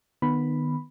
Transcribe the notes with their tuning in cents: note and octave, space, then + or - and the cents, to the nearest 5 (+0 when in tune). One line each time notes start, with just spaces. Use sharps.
D#3 -25 B3 +0 B5 +0